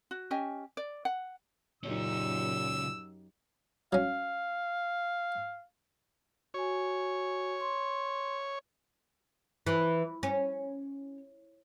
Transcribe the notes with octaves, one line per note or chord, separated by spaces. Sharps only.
F#4
C#4 G4 D#5 G#5
D5
F#5
C#2 F#2 A#2 C#4 D#4 G4 E6
F#3 C#4 F5
F#4 C#5 G#5
C6
E3
C#4